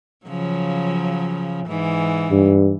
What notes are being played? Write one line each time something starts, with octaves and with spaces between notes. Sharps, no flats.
C#3 F3 F#3
G#2 E3
G2